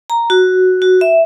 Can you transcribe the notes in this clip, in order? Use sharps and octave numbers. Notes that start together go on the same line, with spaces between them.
A#5
F#4
F#4
E5